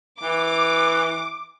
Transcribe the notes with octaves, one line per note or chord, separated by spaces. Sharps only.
E3 D6